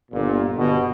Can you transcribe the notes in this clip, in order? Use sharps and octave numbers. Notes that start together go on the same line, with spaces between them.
G1 A#2
G1 B2